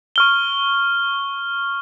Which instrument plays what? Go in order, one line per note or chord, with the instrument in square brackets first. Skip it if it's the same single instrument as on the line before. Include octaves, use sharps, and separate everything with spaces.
[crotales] C#6 F6 G7